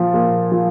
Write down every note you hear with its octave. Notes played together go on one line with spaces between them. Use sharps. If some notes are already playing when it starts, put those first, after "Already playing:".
Already playing: A#2 F3
A#2
F3